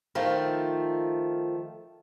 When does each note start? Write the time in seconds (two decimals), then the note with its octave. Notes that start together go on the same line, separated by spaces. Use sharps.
0.15 D#3 F3 A3